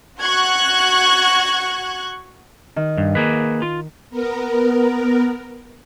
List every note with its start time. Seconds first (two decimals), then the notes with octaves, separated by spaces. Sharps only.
0.21 F#4 C#6 F#6 G#6
2.76 D#3
2.97 G2
3.15 A#3 G#4 B4
3.62 F4
4.10 B3 A#4